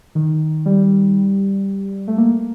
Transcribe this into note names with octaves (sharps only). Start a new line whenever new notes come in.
D#3
G3
A3
A#3